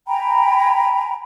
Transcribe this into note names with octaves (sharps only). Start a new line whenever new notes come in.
G5 G#5 A#5 B5